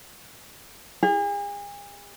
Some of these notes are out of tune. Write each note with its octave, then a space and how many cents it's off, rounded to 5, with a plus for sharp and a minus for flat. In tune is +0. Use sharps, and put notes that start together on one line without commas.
G#4 -40